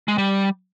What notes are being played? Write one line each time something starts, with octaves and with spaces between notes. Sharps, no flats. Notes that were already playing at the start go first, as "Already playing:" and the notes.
G#3
G3